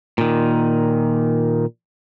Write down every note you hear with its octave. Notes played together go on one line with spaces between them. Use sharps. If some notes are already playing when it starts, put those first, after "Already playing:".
A#2 D#3